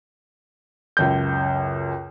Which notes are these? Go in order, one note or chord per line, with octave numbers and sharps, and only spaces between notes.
C#2 F#2 G6